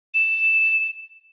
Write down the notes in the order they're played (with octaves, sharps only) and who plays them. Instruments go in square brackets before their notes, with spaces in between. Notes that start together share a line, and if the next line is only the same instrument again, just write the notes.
[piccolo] E7